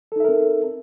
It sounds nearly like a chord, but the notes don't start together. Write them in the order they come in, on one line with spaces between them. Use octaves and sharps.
A4 D#4 E5 A#4 C4